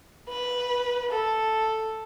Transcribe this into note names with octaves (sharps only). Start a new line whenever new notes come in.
B4
A4